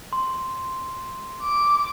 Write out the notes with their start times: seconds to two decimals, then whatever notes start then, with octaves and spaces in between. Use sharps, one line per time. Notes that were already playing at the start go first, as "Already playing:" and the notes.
0.13 C6
1.42 D6